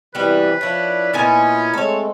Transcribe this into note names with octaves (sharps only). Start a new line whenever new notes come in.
C3 E3 G3 B3 F#4 B4
F3 D4 E4 C#5
A#2 B3 C#4 D#4 E4 D#5 G#5
G#3 A3 C4 A4 C#5